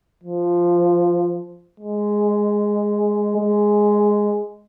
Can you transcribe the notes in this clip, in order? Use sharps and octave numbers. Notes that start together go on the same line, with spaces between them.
F3
G#3
G#3